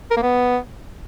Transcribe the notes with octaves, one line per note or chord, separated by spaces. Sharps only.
A#4
A#3
B3